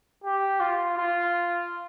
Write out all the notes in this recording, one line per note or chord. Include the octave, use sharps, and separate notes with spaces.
G4
F4
F4